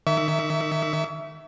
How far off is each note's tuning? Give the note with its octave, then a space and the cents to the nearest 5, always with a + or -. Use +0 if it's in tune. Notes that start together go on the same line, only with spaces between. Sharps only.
D#3 -20 E5 +0 C#6 +40